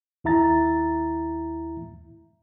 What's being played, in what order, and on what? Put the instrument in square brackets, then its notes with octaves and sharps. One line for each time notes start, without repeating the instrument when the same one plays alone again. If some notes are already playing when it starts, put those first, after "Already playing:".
[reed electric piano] D#2 E4 E5 A#5 A6